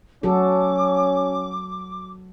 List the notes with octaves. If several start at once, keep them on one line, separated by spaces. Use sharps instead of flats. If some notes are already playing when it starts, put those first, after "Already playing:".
F#3 C#4 F#4 A4 D6